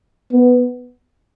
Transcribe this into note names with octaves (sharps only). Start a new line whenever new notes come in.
B3